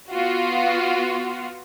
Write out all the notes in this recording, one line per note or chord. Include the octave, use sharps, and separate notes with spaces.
B3 F4 F#4